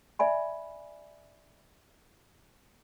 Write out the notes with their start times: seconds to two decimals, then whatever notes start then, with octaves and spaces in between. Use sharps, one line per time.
0.19 D5 E5 G#5 B5